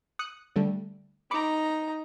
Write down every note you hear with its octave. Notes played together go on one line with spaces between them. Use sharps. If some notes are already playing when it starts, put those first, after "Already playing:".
D#6 F#6 C#7
D3 G3 A3
D#4 A#5 B5 D6 C#7